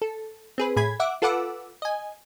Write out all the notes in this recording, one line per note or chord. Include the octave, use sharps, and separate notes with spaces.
A4
C4 G#4 B4
A2 G#4 B5 G#6
E5 F#5 D6
F4 A4 B4 F#5 D6 E6
D#5 G#5